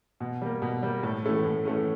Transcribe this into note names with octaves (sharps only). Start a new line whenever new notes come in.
B2
G3 A#3
B2
G3 A#3
A2
E3 A3 C#4
A2
E3 A3 C#4